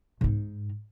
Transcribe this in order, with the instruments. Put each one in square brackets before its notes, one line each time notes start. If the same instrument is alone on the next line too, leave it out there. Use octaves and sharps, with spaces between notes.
[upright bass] G#2 D#4